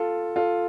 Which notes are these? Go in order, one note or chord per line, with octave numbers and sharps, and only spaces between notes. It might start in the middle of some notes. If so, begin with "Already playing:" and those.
Already playing: F4 A4
F4 A4